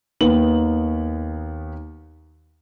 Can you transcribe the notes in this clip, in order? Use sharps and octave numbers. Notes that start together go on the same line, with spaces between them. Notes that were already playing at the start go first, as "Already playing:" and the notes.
D#2 D#3 B3 F#7